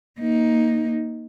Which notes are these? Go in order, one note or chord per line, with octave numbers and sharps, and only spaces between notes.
A#3 D#4